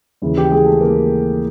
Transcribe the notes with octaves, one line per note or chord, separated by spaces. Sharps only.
D#2 C#3 E3
G4
G#3 G#4
A3 A4
A#3 A#4